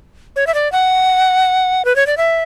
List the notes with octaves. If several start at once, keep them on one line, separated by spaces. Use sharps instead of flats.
C#5
E5
D5
F#5
B4
C#5
D5
E5